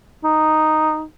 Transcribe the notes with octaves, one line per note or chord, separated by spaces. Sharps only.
D#4